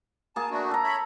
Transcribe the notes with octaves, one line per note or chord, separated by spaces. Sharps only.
A#3 G#4 A5
A3 D4 F#4
A4 A#5
C#5 E5 B5